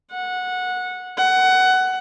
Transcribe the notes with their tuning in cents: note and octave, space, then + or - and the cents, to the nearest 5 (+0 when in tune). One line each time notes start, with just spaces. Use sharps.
F#5 -15
F#5 +15